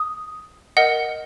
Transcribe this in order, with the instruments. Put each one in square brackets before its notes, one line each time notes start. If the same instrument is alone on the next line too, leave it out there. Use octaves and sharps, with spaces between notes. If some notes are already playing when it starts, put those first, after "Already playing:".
Already playing: [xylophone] D#6
A#4 D#5 F#5